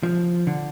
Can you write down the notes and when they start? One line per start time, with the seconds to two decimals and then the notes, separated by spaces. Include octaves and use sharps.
0.03 F3
0.47 D3